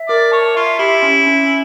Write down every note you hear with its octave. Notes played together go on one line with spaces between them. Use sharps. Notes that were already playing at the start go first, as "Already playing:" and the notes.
Already playing: E5
A#4 D5
C#5 A5
F4 E5
E4 G4
C#4
C#4